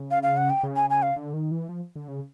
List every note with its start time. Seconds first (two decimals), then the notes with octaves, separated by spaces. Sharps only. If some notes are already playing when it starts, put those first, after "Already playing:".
Already playing: C#3
0.11 F5
0.23 F5
0.37 F#5
0.50 G5
0.63 C#3
0.76 G#5
0.90 G#5
1.03 F5
1.16 D3
1.34 D#3
1.51 E3
1.69 F3
1.96 D3
2.08 C#3